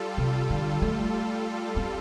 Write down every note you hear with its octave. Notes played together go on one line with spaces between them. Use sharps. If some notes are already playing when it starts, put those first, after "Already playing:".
Already playing: G3 F4 A4
C3
D3
A3
C4